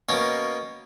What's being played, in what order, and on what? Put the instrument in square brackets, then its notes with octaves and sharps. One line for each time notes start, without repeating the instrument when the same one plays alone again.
[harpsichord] B2 A#3 C#4